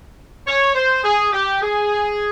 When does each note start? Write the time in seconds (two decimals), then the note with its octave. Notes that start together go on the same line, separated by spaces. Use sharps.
0.47 C#5
0.75 C5
1.03 G#4
1.32 G4
1.62 G#4